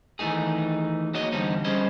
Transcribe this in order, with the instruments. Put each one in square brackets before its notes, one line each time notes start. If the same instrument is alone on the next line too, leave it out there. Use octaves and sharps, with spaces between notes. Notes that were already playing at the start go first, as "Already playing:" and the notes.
[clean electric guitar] D#3 E3 A3 D#4 G#4
A#3 F#4 C#5 D#5
E2 D3 G3 C4 D#4
G3 C#4 G#4 C5 D#5